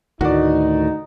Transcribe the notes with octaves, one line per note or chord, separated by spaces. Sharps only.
D2 A2 D#3 D#4 F#4 D5